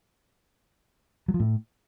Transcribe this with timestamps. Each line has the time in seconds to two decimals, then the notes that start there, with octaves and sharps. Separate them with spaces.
1.28 F#3
1.34 F3
1.40 A2